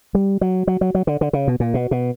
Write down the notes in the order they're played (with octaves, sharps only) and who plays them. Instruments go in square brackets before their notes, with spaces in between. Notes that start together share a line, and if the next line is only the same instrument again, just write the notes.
[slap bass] G3
F#3
F#3
F#3
F#3
D3
D3
C#3
B2
A#2
B2
B2